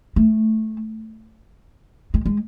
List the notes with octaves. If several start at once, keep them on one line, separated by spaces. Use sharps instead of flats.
A3
G#3
G#3